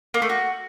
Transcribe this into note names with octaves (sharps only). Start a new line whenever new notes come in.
A#3
A3
F#4